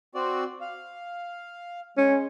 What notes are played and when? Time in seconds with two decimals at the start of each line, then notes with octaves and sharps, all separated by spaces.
0.15 C4 F#4 D5
0.61 F5
1.97 G#3 C#4